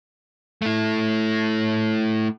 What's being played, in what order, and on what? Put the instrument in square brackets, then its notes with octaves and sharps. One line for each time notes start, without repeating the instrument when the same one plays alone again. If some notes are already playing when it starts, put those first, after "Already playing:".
[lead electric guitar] A3 E4